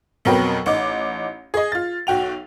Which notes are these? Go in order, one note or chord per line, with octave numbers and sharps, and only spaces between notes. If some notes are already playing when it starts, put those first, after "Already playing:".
F2 B2 F#3 A#4 B4 G5
A1 D#4 D6
G#4 D#5
F4 A6
B1 F#4 G5 F7